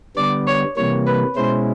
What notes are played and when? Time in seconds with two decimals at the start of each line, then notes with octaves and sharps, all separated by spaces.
0.16 D3 G3 B3 D5
0.47 C#5
0.77 C3 E3 G3 A#3 C#5
1.06 B4
1.36 B2 G#3 C#4 E4 C5